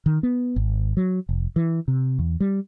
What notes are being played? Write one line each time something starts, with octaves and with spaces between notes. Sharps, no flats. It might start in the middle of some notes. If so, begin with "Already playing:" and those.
D#3
B3
G#1
F#3
F1
E3
C3
E2
G3